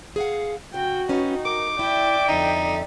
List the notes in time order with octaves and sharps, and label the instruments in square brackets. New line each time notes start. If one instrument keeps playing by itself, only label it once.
[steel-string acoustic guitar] G#4 F5 F#5
[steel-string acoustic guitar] C#3 [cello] F#4 [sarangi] G5
[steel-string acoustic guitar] C#4 B4 [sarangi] D#4
[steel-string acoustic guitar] A#4 [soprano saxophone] D6
[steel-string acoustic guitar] E4 [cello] D5 E5 [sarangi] G5
[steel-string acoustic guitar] F2 D3 [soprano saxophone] D#4